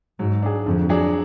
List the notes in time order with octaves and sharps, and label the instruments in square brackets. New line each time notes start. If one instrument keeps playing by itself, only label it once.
[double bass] G#2 [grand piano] F#3
[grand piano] D4 G#4
[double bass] F2 [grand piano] D3
[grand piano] F#3 D4 G#4 D5